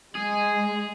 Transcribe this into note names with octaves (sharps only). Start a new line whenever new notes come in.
G#3 G#4